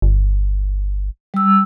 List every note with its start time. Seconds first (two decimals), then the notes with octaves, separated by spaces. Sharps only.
0.02 G1
1.34 G3 E6